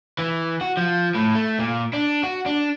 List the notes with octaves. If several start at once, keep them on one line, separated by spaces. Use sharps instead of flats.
E3
F#4
F3
A2
A3
A#2
D4
F#4
D4